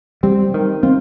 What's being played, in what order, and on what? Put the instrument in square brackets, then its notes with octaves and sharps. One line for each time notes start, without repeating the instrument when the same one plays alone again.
[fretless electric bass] G3 [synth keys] C4
[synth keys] D#3
[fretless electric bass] C4 [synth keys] F4